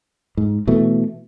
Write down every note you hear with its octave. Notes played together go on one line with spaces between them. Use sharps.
G#2
B2 E3 A3